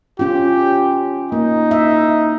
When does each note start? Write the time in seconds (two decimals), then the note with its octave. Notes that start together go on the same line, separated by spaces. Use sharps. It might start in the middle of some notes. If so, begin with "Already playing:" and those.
0.19 C#4 F4 G4
1.32 A#3 D#4
1.71 E5